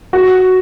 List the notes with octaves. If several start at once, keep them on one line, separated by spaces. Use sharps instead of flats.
F#4